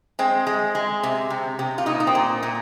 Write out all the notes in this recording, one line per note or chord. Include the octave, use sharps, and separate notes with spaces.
G#3 C4
G#3
G#3
C3
C3
C3
F4
A#2 D#4
D#4
C4
A#2
A#2